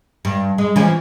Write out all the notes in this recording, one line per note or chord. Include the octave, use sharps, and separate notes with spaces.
G2
G#3
E3 F3 C#4